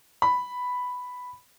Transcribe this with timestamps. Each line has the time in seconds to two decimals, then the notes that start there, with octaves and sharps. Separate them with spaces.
0.22 B5